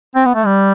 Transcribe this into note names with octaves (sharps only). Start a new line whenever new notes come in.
C4
B3
A3
G3